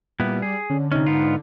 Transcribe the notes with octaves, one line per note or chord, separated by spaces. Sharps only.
A#2 G3 B3 E4
G#4
D3 C#4
C3 C#4 D#4
G#2 B3 F4